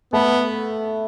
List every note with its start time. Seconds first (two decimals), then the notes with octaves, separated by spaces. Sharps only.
0.13 A3 B3 A4